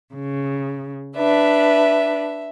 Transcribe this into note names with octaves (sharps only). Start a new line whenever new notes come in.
C#3
D4 B4 E5